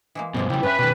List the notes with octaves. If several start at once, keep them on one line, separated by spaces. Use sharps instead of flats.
E3 G#3 A#3
G2 B2 F3 G#3 A#3
C#3 G3 E4 G4
G2 C#4 B4 E5
B2 D#3 G3 A5